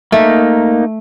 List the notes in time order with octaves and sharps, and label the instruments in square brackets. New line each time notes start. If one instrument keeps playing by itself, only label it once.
[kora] A3 [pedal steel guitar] A#3 D#4